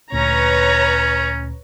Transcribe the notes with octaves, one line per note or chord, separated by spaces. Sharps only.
D2 A#2 C#4 B4 C#5 A#5